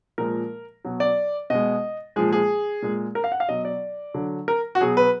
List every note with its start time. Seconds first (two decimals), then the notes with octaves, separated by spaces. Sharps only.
0.18 A#2 F3 G#3 A#4
0.85 B2 F#3
1.00 D5
1.50 B2 G#3 D#5
2.16 A#2 F3 G#3 G#4
2.32 G#4
2.82 A#2 G#3
3.15 A#4
3.24 F5
3.32 F#5
3.40 F5
3.48 B2 F#3 D#5
3.65 D5
4.14 D3 F#3
4.48 A#4
4.75 F#4
4.81 B2 F#3 G#4
4.97 B4